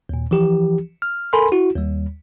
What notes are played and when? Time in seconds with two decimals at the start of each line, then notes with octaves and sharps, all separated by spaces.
0.09 D#2 A#2
0.31 E3 F3 G4
1.02 F6
1.33 A4 A#4 G#5 B5 C6
1.52 E4 F#4
1.76 D#2 G3